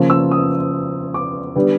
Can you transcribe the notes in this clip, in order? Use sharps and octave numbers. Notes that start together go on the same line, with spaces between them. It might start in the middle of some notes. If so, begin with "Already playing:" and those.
Already playing: C#3 F3 A#3
E6
D#6
D6
D3 G3 B3